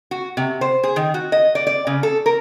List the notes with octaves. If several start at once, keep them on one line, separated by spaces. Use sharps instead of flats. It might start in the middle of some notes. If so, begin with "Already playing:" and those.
F#4
C3
C5
G#4
D#3
F#4
D#5
D5
D5
C#3
A4
A#4